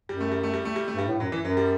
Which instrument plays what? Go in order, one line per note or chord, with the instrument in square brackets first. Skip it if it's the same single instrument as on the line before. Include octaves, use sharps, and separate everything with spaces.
[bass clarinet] F#2 [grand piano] G3
[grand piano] A3
G3
A3
G3
A3
G3
A3
[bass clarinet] G2
[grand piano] G3
[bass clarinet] A2
[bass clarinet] F#2 [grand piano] F#3
[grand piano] E3
[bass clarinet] F#2
[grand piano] F#3
G3